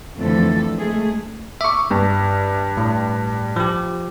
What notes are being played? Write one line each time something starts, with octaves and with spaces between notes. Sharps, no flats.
F2 D3 E3 F3 A3 A4
G#3 A3 G#4
E5 C#6 D6
G2
A2
F3 G4